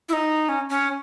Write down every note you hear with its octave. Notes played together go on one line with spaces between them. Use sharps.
E4
D#4
C#4
C#4